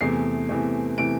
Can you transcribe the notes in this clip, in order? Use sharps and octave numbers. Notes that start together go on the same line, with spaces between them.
E2 C3 E3 A3 C7
E2 C3 E3 A3
C3 E3 A3 D7